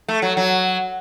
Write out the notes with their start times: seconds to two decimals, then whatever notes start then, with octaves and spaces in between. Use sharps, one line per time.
0.08 A3
0.22 F#3
0.37 F#3